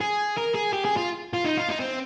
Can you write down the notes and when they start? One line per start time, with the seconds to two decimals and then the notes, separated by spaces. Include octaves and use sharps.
0.01 G#4
0.38 A#4
0.55 G#4
0.73 G4
0.85 G#4
0.97 F4
1.33 F4
1.45 D#4
1.57 F4
1.69 D#4
1.80 C4